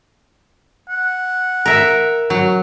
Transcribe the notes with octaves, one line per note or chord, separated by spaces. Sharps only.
F#5
A#4 E5
F#3